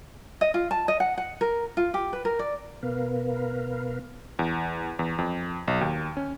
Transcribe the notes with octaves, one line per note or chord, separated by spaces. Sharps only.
D#5
F4
A5
D#5
F#5
F#5
A#4
F4
G4
B4
A#4
D5
B2 B3 A#4 B4 F5
E2
E2
F2
B1
D#2
C#4